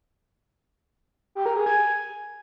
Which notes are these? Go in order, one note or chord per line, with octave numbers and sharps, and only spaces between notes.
G4
A#4
G#4
G#5